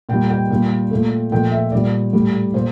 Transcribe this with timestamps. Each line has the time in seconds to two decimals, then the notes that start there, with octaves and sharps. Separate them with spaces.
0.09 A#2 G3 G5
0.30 G5
0.50 A#2 G3
0.91 A#2 A3
1.32 A#2 F3 A3 G5
1.52 E5
1.72 A#2 G3 D5
2.13 A2 G3
2.53 A#2 C5